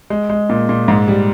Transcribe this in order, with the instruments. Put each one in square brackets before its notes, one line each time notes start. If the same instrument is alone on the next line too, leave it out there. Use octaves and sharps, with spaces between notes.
[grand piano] G#3
G#3
A#2
A#2
G#2
G3